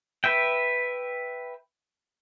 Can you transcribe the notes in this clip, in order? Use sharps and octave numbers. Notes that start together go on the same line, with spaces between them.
B4 E5 G5